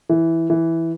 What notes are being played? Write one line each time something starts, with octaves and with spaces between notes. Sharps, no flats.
E3
E3